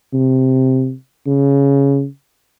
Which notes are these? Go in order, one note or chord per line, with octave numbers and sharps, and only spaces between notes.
C3
C#3